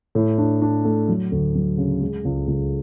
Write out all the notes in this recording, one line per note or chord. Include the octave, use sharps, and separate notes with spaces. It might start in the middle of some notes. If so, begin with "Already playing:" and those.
A2
D4
D4
A3
F#3
D2
F#3
C#3
G#3
C#2
C#2